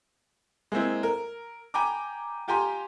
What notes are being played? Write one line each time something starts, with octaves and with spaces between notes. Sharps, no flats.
G#3 A#3 C4 E4
A#4
G5 G#5 A#5 B5 D6
F4 G4 G5 G#5 A#5 C6